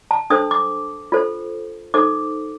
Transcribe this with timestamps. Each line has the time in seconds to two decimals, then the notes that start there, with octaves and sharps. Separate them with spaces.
0.11 A5
0.30 D4 A4 C5 D#6
0.51 D6
1.12 F4 A4 C5
1.94 D#4 A4 C5 D6